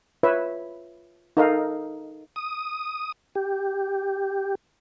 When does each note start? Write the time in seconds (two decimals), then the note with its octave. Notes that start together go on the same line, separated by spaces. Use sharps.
0.23 F4 B4 C#5 E5
1.37 D#4 A4 A#4 D#5 F5
2.36 D#6
3.35 G4